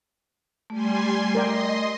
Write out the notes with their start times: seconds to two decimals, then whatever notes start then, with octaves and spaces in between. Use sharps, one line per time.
0.70 G3 A3 G#5 C6
1.35 A#4 D5 D#5 G5 C6